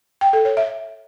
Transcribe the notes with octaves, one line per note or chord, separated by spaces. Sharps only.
G5
A4
C#5
E5